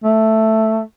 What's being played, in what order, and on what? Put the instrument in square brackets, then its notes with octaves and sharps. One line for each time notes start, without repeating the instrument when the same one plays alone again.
[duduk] A3